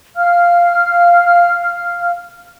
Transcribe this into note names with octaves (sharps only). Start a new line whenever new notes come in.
F5 F6